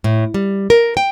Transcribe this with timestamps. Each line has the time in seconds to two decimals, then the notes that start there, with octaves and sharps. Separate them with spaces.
0.04 A2
0.34 G3
0.70 A#4
0.97 G5